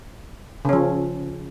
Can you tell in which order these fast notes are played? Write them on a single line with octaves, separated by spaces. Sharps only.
C#3 C#4 F3